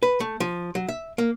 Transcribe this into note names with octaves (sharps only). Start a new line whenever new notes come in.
B4
A3
F3
F#3
E5
A#3